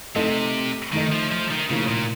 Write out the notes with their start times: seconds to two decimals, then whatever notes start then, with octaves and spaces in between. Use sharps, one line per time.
0.16 C3 A3 D#4 A4 D#5
0.93 D#3 A3 D#4 A4 D#5
1.12 F3
1.32 F3
1.51 D#3
1.70 A2 C#3 F3 A#3 D#4
1.89 A#2